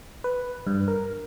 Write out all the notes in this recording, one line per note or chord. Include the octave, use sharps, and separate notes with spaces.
B4
G2
A#4